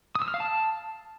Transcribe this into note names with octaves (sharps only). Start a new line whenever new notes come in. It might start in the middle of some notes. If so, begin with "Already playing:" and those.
D#6
E6
F6
F5
A5